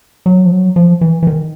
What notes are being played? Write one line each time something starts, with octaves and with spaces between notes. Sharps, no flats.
F#3
F3
F#3
F3
E3
E3
D#3